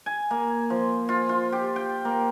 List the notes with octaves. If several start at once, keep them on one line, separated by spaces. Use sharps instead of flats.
G#5
A#3
F3
F4
F4
G4
G5
A#3